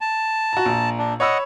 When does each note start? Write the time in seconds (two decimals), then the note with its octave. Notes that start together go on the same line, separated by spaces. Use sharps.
0.01 A5
0.53 F#4 A#5
0.66 A#1 A#5
0.98 D4
1.20 C#5 D#5 F#5 B5 E6